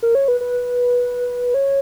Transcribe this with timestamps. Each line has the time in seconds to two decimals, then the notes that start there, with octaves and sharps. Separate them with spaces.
0.03 A#4
0.15 C#5
0.28 B4
0.41 B4
1.54 C#5